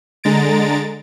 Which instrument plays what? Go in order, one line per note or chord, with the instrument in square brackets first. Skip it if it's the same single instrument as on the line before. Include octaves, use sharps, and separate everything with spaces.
[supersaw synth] D3 G#3 A#5 A6 D7